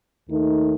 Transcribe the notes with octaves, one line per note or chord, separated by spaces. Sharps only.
D#2 D#3 A3 D#4